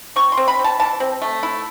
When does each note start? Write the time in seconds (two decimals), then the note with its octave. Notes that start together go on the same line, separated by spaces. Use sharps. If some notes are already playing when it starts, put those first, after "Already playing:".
0.16 C4 C#6
0.32 C6
0.37 C4
0.48 B5
0.59 C4
0.64 A5
0.80 E3 A5
1.00 C4
1.22 A3
1.43 E4